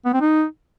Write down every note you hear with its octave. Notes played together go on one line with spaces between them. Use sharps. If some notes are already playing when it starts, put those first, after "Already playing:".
B3
C4
D#4